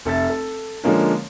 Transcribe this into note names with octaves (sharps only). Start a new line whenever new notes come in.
F1 A4 E5 A6
A4
D3 F3 G#3 A#3 C#4